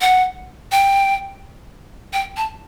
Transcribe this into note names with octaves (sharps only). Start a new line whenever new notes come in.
F#5
G5
G5
A5